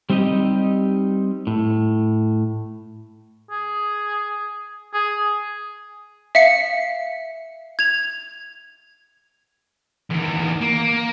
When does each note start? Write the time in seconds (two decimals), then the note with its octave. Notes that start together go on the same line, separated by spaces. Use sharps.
0.10 G3 C4 D#4 G4 D#5
1.47 A2
3.51 G#4
4.94 G#4
6.35 E5 F5 B6 C#7
7.79 G#6 F7
10.11 E2 D#3
10.61 A#3